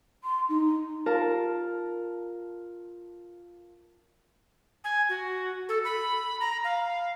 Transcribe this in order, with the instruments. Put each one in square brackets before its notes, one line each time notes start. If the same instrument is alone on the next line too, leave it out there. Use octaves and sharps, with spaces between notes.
[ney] C6
D#4
[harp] F4 A#4 A5
[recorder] G#5
F#4
A4
B5
A#5
F5